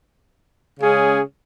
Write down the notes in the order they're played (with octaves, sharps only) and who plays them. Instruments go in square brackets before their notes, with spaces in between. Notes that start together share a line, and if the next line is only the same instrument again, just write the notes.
[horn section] C#3 G#3 C#4 G#4